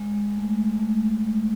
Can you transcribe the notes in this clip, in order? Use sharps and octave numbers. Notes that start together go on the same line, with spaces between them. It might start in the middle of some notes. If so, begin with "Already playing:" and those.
Already playing: G#3
A3
A3
A3
A3